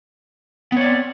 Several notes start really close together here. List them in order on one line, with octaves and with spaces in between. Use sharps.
B3 C#5 D5 C4